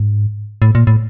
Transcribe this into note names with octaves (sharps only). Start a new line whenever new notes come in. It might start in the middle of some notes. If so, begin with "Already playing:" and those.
Already playing: G#2
A2
A#2
A2